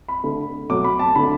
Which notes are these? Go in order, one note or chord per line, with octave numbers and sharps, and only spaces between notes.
B5
D3 A3
B2 F#3 A3 D6
B5
A5
D3 A3 B5